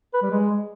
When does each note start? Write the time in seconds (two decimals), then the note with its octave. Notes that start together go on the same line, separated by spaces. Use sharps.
0.14 B4
0.22 G3
0.31 G#3